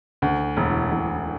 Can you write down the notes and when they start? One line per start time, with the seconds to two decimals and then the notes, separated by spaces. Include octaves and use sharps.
0.22 D2
0.57 E1
0.91 E1